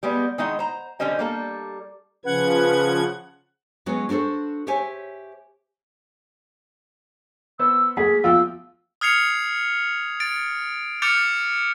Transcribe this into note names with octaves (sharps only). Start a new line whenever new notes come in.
G3 G#3 B3 D#5
D#3 G#3 D#4 E4 D#5 F#5
C5 A#5
D3 G3 C#4 C5 D#5 G#5
G3 A#3 A4
C#3 F3 C#4 B4 F#5 G#6
F#3 G#3 B3 C#4 F#4
D4 F#4 G4 A4 C5
G4 C5 C#5 E5 G#5
B3 C5 E6
F#3 A3 A#3 G#4 B6
E2 F3 F4 G5 E6
D#6 F6 G#6 C7 C#7 F7
A6 D7
D6 F6 G6 A6 C#7 F7